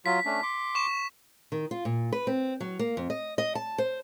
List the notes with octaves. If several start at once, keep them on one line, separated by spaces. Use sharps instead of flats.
F#3 F4 B6
A3 C#4 D4
C6 D6
C#6 E7
D#3
F4
A#2
B4
C4
F#3
A#3
F2
D#5
D#5
A5
C5